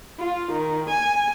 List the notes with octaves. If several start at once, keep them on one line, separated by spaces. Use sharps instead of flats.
F4
D#3
G#5